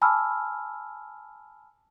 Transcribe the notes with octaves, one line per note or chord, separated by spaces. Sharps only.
G#5 A5 B5 D6 E6 F6